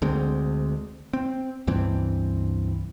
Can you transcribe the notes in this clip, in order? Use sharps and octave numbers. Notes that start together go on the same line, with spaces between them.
D2 D3 G#3 C4
C4
C#2 G2 E3 C4